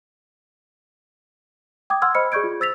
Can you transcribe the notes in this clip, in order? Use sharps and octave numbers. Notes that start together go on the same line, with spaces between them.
G5 D6 D#6 G#6
F#5 C6 E6 F6 G#6
C5 D#5 B5 F6 C#7
G#4 D5 C#6 G6 G#6 D7
F4
C5 E6 A6 B6 F7